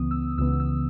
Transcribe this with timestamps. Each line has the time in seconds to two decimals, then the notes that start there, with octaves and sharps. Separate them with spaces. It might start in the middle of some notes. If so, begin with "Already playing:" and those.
Already playing: C#2 C#3 E3 B3 D#6
0.11 E6
0.38 C#2 C#3 E3 B3 E6
0.60 E6